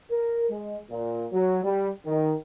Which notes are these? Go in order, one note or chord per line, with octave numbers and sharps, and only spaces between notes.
A#4
G#3
A#2
F#3
G3
D#3